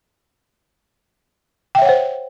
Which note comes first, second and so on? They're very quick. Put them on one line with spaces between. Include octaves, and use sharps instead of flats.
G5 E5 C#5 F#5 C5